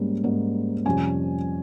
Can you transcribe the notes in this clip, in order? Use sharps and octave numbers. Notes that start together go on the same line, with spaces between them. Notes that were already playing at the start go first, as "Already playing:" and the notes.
Already playing: G#2 G3 A#3 C#4
G#2 G3 A#3 C#4
F2 C3 G3 C#4 G#5